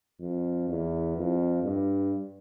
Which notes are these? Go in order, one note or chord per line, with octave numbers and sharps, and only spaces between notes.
F2
E2
F2
G2